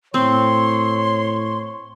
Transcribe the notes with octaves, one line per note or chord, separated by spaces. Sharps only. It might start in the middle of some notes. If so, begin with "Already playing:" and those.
A2 C4 C#5 C6